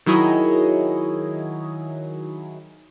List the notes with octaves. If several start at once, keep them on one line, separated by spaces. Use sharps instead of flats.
D#3 F#3 E4 G#4 C#5 D#5